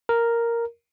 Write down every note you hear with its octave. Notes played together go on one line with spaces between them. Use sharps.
A#4